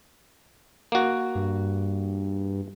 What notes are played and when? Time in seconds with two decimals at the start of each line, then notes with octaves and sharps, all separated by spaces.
0.92 A#3 F#4
1.35 G2